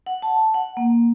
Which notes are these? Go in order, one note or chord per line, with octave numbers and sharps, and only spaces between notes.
F#5
A5
F#5
A#3